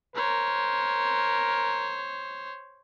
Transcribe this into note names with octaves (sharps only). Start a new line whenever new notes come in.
A#4 C5 C#5